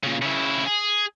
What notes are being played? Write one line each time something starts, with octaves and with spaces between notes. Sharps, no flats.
A#2 C#3
C#3 E4
G#4